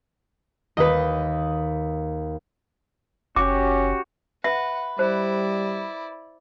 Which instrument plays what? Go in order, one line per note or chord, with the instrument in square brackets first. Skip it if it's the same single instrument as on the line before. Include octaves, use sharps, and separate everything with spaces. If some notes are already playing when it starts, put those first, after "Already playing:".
[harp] D#2 [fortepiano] B4 D#5
[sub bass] F#1 [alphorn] C#4 [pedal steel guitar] F#4 G4 [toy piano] D6
[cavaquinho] B4 [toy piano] E5 [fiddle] F#5
[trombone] G3 [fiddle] E4 D5 [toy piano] C5